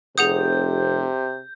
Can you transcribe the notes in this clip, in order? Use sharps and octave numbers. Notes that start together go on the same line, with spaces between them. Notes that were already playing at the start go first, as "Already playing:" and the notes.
F1 C3 G#4 F#5 D#6 G6